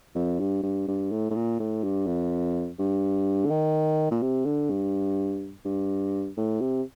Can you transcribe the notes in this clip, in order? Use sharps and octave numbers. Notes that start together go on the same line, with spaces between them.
F2
G2
G2
G2
A2
A2
A#2
A2
G2
F2
G2
D3
D#3
A#2
C3
D3
G2
G2
A2
C3